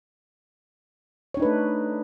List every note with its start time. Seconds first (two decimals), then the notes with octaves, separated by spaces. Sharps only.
1.34 C#5
1.37 D4
1.40 D#4
1.42 B4
1.45 A3